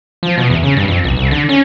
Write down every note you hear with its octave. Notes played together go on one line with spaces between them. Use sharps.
F3
B2
E2
C#3
G2
F2
B1
C2
D3
C#4